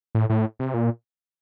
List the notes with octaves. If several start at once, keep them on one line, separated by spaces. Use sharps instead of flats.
A2
A2
C3
A#2